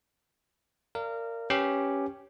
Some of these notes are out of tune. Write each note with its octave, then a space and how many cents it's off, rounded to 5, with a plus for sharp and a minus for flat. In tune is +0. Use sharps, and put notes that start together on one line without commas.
A#4 -20 D5 +0 F5 -30
C#4 +0 G4 +0 B4 -5